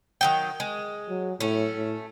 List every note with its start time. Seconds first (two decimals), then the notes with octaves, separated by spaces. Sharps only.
0.21 D#3 F#3 G5
0.60 G#3
1.09 F#3
1.40 A2 A3 C#4
1.76 A2